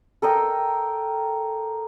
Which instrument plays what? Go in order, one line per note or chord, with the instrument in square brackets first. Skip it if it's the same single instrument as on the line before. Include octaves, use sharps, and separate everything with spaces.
[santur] A4 A#4 D#5 G5